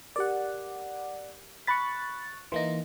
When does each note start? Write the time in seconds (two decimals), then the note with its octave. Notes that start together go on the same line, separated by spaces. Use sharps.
0.16 G4 A#4 D5 F#5
1.67 B5 C#6 F#6 A6 B6
2.52 E3 A#3 D#4 C6 A#6